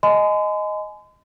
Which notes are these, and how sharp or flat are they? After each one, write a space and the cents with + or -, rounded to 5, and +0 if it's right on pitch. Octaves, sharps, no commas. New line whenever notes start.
D#5 +0 G#5 +25 C6 -45